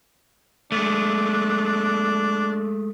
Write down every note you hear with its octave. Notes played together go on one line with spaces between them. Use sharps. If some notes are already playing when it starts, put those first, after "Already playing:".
G#3 A3 D4